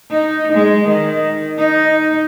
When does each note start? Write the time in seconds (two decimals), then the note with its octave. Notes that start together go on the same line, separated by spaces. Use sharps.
0.10 D#4
0.53 G#3
0.88 D#3
1.58 D#4